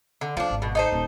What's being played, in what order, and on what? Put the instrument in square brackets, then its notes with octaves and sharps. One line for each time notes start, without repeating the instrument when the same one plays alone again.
[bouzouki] D3
[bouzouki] F3 D4 [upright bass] F4
[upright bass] G#1
[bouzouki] B2
D#4 A4 C5
[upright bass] D#1